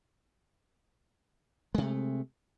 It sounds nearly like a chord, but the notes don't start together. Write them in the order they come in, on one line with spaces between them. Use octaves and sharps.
G#3 C3 A3